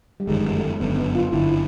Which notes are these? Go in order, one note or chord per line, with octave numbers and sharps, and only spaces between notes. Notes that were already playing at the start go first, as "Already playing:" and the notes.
G3
G1 F#2 D#3 G#3
A3
G1 F#2 D3 B3
B3
F4
G1 F#2 D3 E4